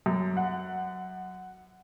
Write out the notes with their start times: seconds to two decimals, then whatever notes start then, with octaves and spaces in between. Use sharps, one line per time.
0.06 F#2
0.37 F#5